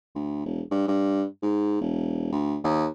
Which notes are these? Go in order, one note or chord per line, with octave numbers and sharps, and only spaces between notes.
D2
E1
G2
G2
G#2
E1
D2
D#2